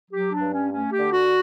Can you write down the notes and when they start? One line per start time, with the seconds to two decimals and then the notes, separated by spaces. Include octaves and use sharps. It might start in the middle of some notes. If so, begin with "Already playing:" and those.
0.10 F#3 G4
0.31 D4
0.41 G2
0.51 C#4
0.70 A3 C#4
0.91 G4
1.00 D3
1.10 F#4